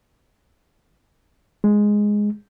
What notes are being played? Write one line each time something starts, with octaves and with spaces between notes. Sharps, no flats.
G#3